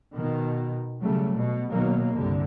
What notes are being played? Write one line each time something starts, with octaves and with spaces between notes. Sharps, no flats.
B2 D#3
C#3 F#3 G3 A3
B2
B2 D#3 F#3 A#3
C2 G2 D3